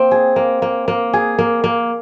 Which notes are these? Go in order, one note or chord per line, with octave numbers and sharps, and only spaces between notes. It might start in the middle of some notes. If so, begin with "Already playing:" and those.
Already playing: A#3 C4
G#4
A#3
A#3
A#3
G#4
A#3
A#3